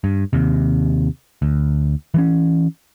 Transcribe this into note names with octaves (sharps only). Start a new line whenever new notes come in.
G2
D#2 C3
D2
E3 G3 C#4